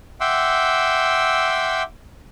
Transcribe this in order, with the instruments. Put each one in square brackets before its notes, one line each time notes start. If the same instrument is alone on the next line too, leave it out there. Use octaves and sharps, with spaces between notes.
[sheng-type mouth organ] E5 F#5 G5 C6 D6 E6